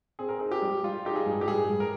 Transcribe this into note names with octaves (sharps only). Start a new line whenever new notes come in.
C4 G#4
A#4
D#4 G#4
G4
G3
G3 F4
D#4 G4
G#4
G2
G4
G2 G#4
G2
A#4